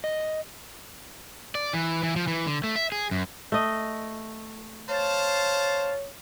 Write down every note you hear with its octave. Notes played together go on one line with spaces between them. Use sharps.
D#5
D5
E3
E3
F3
E3
D3
A3
E5
G#4
F#2
A3 D#5
C5 C#5 F5 A5